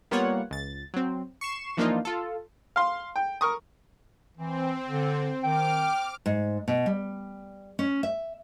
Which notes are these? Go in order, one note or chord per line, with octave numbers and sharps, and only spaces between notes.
G3 A#3 B3 F4 C#5 F#5
C#2 A6
F#3 C4
C#6 C7 E7
E3 F3 A#3 D4 D#4 F4
F4 A4
F5 C6
G5
A#4 C#6 D#6
E3 C4
D3
D#3 G5 D6 F6
G#2
B2
G3
C#4
E5